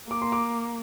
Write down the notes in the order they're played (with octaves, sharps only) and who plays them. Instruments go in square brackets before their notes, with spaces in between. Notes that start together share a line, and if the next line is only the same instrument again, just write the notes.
[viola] A#3 [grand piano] D6
[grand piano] C6
D6